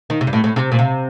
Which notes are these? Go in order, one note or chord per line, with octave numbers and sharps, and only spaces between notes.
D#3
C3
G2
A2
A2
C3
A#2
C3